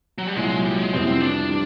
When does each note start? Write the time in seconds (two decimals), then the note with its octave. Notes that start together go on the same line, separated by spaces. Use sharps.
0.18 F#3
0.27 G3
0.36 C2 A#2 F#3 G#3
0.65 G3
0.78 G#3
0.92 F2 C3 E3 G3 B3 C4
1.07 C4
1.21 D4
1.49 D#3 G3